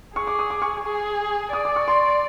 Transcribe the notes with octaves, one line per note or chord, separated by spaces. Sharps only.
G#4 C#6
D6
D#6
D6
C#6
G#4
D5 D#6
D6
C#6
C6